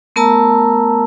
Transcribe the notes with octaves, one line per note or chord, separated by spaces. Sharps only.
A3 B3 A#4 A5 A#5 E6